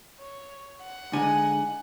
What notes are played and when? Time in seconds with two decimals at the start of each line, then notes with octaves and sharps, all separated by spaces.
0.19 C#5
0.81 F#5
1.13 D3 G#3 D#4 G#5